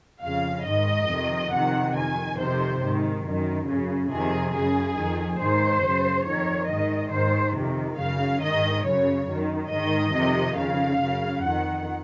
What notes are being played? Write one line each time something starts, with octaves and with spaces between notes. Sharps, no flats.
F2 C#3 F5
G#2 D#3 D#5
F2 C3 D#3
F2 C3 D#3 F#5
F2 D#3 G#5
F2 C3 D#3 C5
G#2 D#3
F#2 D#3
F#2 C#3
F2 C3 D#3 G#4
F#2 C#3 G#4
F2 D#3
G#2 D#3 C5
F#2 C#3
F2 D#3 C#5
G#2 D#3 D#5
G#2 D#3 C5
F2 C3 D#3
F#2 C#3 F5
G#2 D#3 D#5
F#2 C#3 C#5
F#2 D#3
G#2 D#3 D#5
F2 C3 D#3
F2 C#3 F5
F#2 C#3
F2 D#3 F#5